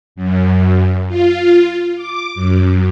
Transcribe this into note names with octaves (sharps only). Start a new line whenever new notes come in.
F#2
F4
D6
F#2